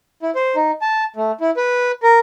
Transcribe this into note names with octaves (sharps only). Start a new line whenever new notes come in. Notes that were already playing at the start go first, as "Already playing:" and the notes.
E4
C5
D#4
A5
A3
E4
B4
A#4